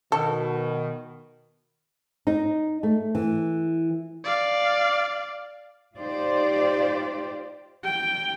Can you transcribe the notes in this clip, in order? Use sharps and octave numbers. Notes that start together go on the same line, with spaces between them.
B2 D#3 A4
D#4
A3
E3
D5 F5
D#4 F4 G4 C5 D5
G5